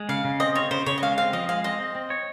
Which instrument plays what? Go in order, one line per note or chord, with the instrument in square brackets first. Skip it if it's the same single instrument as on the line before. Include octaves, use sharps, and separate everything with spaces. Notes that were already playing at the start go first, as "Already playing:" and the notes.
Already playing: [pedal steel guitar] G#3
[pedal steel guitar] C#3 [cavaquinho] F5
[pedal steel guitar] C#3
[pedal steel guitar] C4 [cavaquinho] D#5
[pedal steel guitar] F4 [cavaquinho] C#5
[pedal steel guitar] C#3 [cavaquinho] C5
[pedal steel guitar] C#3 [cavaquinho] C#5
[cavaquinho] D#5
[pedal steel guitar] G#3 [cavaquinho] F5
[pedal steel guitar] C4 [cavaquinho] F5
[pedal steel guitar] F3 [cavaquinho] D#5
[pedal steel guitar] G#3 [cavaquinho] F5
[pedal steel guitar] C4 [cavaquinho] D#5
[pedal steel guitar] C4
C4
C#5